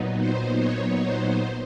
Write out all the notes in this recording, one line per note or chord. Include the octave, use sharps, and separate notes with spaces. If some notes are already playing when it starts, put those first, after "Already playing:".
Already playing: A#2 F#3 B3 D#4
C5
C#5
C5